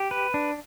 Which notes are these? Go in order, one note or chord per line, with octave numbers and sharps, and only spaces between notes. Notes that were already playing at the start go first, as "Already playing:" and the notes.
Already playing: G4
B4
D4